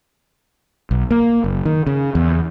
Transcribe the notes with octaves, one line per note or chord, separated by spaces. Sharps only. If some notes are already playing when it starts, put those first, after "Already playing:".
B1
A#3
F#1
D#3
C#3
E2